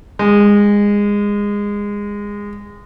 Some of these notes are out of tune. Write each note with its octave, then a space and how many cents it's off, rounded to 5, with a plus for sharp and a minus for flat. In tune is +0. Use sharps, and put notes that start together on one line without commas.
G#3 -20